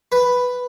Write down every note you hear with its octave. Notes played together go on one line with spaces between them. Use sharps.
B4